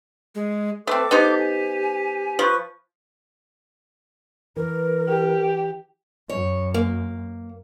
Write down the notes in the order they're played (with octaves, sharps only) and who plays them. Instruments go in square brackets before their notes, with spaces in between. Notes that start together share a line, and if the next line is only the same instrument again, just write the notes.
[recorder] G#3
[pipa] A3 C4 [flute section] A4 D6 [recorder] B4
[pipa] B3 D#4 C5 [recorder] G4
[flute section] G#5
[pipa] F3 [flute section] B4 C#6
[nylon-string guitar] E3 [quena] A#4
[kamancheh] G4
[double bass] F#2 [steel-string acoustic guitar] C#5
[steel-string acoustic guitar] A#3